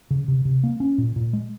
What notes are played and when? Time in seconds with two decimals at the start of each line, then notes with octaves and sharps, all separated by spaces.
0.11 C#3
0.28 C3
0.45 C3
0.64 A#3
0.80 C#4
0.98 A#2
1.16 A#2
1.33 G#3